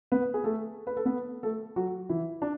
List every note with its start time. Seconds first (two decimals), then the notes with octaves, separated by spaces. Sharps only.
0.12 B3 B4
0.34 G#4
0.44 A3 A4
0.87 B4
0.97 A4
1.05 B3 B4
1.43 A3 A4
1.76 F#3 F#4
2.09 E3 E4
2.42 D4